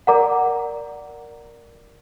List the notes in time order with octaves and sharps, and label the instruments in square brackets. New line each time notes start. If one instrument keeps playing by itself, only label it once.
[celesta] A#4 D5 F#5 A#5 D6